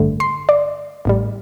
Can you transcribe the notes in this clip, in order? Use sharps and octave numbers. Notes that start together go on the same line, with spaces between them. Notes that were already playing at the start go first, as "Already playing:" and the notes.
Already playing: A1 G2 D3 A3
C6
D5
A1 A2 G3